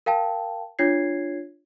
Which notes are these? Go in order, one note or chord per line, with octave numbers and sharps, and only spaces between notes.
A#4 F5 G5 A5
D4 F4 C#5 G#6 C7